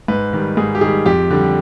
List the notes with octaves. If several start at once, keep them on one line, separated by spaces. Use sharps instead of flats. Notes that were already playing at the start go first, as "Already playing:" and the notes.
G#2 B4
D#3 G3
G#2 G#4
G4
D#3 G3 G#4
F2 G4
D3 G3